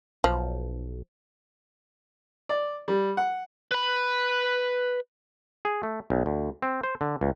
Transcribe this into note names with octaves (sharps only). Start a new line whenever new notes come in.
B1 F3
D5
G3
F#5
B4 B5
G#4
A3
B1
D2
C4
C5
D3
C#2